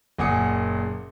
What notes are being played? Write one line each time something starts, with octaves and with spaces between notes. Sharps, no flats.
F#1 A#2 F#5 G#5 D#6 C#7